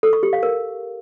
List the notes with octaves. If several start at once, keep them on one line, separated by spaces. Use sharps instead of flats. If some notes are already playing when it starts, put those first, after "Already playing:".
A4
C#6
G4
F5
A#4